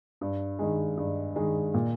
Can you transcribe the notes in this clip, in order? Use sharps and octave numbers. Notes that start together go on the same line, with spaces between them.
G2
D#3 G#3
G2
D#3 G#3
A#2